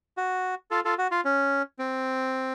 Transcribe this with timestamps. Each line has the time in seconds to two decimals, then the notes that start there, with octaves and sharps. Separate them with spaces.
0.17 F#4
0.71 F4 A4
0.85 F4 A4
0.98 F#4
1.11 F4
1.25 C#4
1.79 C4